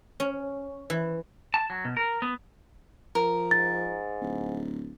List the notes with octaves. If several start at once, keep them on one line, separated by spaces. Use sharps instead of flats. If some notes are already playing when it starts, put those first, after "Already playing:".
C#4
E3
A5
F#3
B2
A#4
B3
F3 A#4
G#2 A6
D1